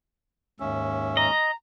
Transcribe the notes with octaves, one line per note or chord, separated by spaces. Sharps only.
D#2 G#2 C#4 E5
D#5 A#5